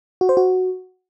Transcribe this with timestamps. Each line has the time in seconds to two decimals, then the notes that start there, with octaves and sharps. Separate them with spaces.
0.21 F#4
0.29 C5
0.37 F#4